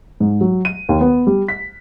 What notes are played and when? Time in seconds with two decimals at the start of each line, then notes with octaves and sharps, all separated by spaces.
0.20 G#2
0.41 F#3
0.65 D#7
0.89 D#2
1.01 B3
1.27 G3
1.48 B6